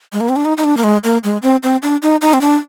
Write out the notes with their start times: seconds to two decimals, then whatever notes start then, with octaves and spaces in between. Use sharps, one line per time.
0.13 G#3
0.21 A#3
0.29 C4
0.36 D4
0.45 D#4
0.57 D#4
0.64 D4
0.77 A#3
0.84 G#3
1.04 A#3
1.24 G#3
1.42 C4
1.63 C4
1.83 D4
2.02 D#4
2.22 D#4
2.33 C4
2.41 D4